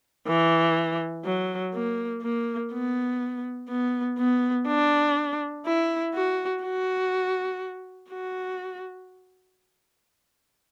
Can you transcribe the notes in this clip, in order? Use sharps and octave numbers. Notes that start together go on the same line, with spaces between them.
E3
F#3
A#3
A#3
B3
B3
B3
D4
E4
F#4
F#4
F#4